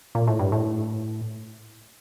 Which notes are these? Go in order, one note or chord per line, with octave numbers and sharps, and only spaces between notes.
A#2
A2
G2
A2